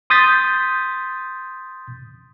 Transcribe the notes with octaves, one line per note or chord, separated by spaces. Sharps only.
C6 D#6 G6 A6 B6